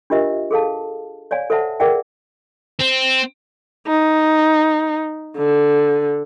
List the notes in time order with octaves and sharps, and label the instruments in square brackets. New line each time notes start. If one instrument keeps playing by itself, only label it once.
[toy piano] D4 F4 G4 A#4 D#5 E5
G#4 A4 F5 A5
C#5 D5 F5 G#5
A4 C5 E5 F#5 A5
G#4 A#4 D5 E5 F#5 G5
[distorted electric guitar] C4
[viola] D#4
D3